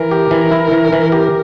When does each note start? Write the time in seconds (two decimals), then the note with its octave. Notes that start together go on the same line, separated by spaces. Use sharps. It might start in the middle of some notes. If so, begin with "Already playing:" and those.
Already playing: E3 A#4
0.11 G4
0.31 E3
0.51 E4
0.71 E3
0.93 E3
1.12 G4